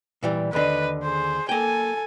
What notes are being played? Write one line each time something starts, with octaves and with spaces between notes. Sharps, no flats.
A#2 E3 G3
D#2 D3 B4 D#5
G#4 C5
A#3 A4 G5 G#5